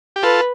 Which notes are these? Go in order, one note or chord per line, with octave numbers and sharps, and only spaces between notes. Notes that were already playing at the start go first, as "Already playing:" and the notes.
G4
F4 A4 B4